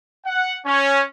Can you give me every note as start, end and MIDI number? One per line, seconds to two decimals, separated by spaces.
0.25 0.54 78
0.64 1.02 61